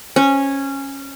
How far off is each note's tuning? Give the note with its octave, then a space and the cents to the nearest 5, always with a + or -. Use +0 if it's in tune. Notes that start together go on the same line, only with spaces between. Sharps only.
C#4 -10